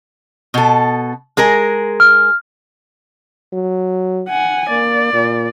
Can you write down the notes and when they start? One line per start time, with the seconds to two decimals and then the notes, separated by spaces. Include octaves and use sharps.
0.54 B2 A4
1.37 G#3 G#4 A#4
2.00 F6
3.53 F#3
4.28 F#5 G#5
4.69 A#3 D5
5.14 A#2